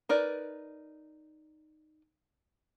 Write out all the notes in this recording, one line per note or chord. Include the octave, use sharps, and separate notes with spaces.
D#4 A#4 B4 D5